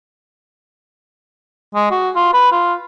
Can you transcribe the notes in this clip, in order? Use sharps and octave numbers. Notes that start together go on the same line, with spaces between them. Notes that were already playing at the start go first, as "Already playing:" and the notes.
G#3
F#4
F4
B4
F4